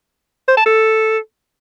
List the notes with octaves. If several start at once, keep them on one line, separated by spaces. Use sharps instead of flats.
C5
A5
A4